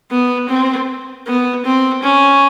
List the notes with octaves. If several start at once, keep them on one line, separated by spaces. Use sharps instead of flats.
B3
C4
B3
C4
C#4